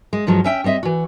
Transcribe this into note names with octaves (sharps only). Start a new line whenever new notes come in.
G#3
G2 F3 F#3 G#3
C#4 E5 G5
G3 C4 D#5 E5
E3 F#4